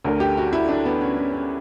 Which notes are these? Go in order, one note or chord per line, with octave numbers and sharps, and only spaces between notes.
D2 D3 A#4
G4
F#4
E4
D4
B3
C#4
C#4
C#4